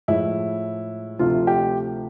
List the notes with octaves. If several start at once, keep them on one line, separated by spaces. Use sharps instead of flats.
A2 F3 G#3 E4
D2 C3 F3 A3 F4
G4